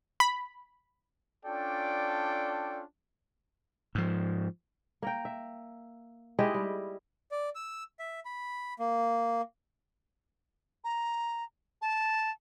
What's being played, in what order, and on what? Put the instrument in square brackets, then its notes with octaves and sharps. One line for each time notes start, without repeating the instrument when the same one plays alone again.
[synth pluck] B5
[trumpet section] C#4 D4 F4 A4 D5 G5
[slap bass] G#2 F3
[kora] A#3 A#4 G5
E5
G#3 E4 G4 D#5
G3
[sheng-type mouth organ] D5
E6
E5
B5
A#3
[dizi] A#5
A5